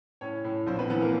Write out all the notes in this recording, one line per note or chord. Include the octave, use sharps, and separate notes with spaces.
A2 C#4 C#5
A2
A#1 C4 C5
B3 B4
E3 B3 B4
A#3 A#4